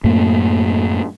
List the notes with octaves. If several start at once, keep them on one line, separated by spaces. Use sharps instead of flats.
F#2 A2 A3 A#3